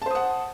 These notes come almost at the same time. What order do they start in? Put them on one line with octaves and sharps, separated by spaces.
A5 C5 D#6 F#5